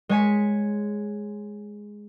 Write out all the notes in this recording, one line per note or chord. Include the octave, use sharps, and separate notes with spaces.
G#3 C#5 G#5 B6 C#7